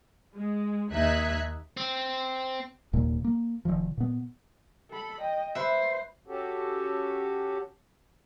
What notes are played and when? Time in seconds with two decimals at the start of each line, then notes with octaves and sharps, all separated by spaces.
0.36 G#3
0.92 D#2 D#4 E5 F#6 G#6 B6
1.77 C4
2.93 F1 D#2 A#2 A#3
3.24 A#3
3.65 F1 C2 D#3 F3
3.97 A#2 B3
4.91 A4 B5
5.21 D#5 G5
5.55 B4 C5 E5
6.28 C#4 F#4 G4 A4